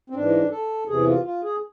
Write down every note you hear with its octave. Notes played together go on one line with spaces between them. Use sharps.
C4
G#2 E3 D4
A4
E2 C3 E3 G#4
F4
F4
G#4